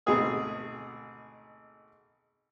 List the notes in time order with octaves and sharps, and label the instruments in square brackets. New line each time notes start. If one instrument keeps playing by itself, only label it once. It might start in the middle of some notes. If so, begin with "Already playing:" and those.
[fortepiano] G#1 D2 B2 C4 G#4 D#6